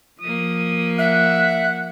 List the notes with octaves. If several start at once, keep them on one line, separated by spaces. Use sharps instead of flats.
F3 A#3 D#6
E5 F#5 F#6